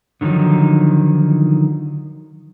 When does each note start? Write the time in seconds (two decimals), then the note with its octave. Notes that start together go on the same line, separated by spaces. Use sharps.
0.21 D3 D#3 F3 F#3 D#4